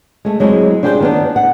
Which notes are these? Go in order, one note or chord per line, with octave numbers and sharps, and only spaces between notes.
G#3 A3
F#3 G#3 C4 E4
D4 F4 G4 G#4 B4 C5
D#3 B3 D4
F#5